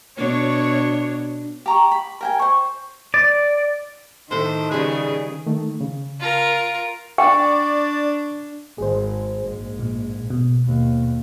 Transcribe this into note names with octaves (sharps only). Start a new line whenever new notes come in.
B2 D4 C#5
G4 A#5 C#6
B5
A#4 G5 G#5
C5 C#6
D5
A2 D#3 A4 C5
C#3 G3 G#4 B4
D#3 A3
C#3
F4 A#4
D4 D5 G5 C#6
G#1 G#4 C5
A#1 G#2
A#2
B2
D#2